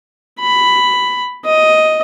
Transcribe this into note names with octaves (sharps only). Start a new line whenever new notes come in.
B5
D#5